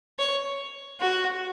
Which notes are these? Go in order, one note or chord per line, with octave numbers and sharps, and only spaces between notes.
C#5
F#4